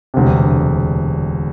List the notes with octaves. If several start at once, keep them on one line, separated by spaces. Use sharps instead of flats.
E1 D2 C3